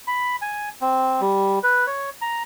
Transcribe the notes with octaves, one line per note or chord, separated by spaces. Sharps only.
B5
G#5
C4
G3
B4
C#5
A#5